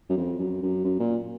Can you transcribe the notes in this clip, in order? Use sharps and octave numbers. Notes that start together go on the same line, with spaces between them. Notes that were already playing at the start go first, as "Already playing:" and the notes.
F#2
F2
F#2
F#2
F#2
A#2